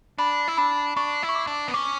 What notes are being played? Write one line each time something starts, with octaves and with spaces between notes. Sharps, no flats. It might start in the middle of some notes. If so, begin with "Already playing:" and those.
D4 B5
E4
D4 B5
D4 C#6
E4
C#6
D6
D4
B3
C#4 D6